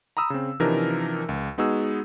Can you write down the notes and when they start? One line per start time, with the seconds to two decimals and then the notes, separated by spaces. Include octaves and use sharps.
0.17 A#5 B5 D#6 E6
0.30 C#3 C4
0.60 C3 E3 F3 D4 D#4 A#4
1.29 C#2
1.58 G#3 B3 D#4 F#4 G#4 E6